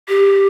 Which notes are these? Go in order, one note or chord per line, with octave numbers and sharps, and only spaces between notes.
G4